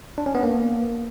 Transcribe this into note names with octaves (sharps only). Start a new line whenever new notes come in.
D4
C#4
B3
A#3